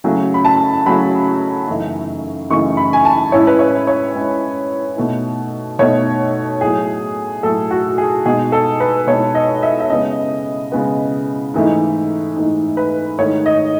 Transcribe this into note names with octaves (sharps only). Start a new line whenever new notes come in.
C#3 F#3 A3 C#4
B5
A5
C#3 F#3 A3 C#4 B5
F#2 C#3 E3 A3 D#4
F#2 C#3 E3 A3 D#4 C#6
B5
G#5
A5
A2 G#3 C#4 E4 C#5
B4
C#5
C#5
A2 G#3 C#4 E4
B2 A3 D#4
B2 A3 D#4 C#5
A2 F#3 A3 G#4
A2 F#3 A3 A4
F#4
G#4
B2 G#3 D#4 G#4
A4
B4
B2 G#3 D#4 C#5
D#5
E5
E5
C#3 G#3 B3 D#5
C#3 G#3 B3
G#2 E3 A3 D#4
G#2 E3 A3 D#4
B4
G#2 D#3 A3 C#5
D#5